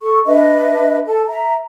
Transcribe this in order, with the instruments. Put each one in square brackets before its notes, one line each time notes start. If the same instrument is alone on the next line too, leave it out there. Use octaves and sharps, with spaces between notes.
[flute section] A4 C#6
D4 B4 D#5 E5
A4 A5
E5 A#5